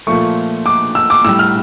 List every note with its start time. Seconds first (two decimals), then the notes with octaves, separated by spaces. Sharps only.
0.07 A#2 F3 A3 C#6
0.66 D6
0.95 E6
1.10 D6
1.24 A2 G3 E6
1.39 F6